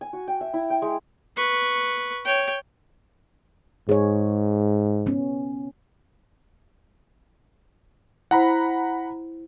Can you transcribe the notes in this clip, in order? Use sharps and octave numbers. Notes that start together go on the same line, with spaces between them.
G#5
F#4
G5
E5
E4
G5
G#3
B4 C#6
C#5 G5
G#2 G#4 C#5
B3 C#4
E4 C5 F#5 A#5 B5